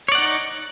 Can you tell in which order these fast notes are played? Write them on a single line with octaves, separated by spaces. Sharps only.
C#5 D5 F#5 D#4